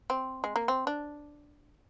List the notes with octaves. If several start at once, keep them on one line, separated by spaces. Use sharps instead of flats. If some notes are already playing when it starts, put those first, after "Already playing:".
C4
G#3
A#3
C4
D4